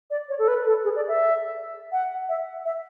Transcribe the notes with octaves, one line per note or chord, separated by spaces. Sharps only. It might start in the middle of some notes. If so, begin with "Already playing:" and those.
D5
C#5
A4
B4
A4
G#4
D5
E5
F#5
E5
E5